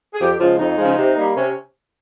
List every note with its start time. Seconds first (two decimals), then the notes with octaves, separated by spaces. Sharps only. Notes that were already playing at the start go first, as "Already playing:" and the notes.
0.13 G#4
0.19 F2 G4
0.39 C#3 F3 G#3 F4
0.58 F2 D#4
0.78 C#3 F3 G#3
0.97 C3
1.16 G3 A#3
1.35 C3 C#4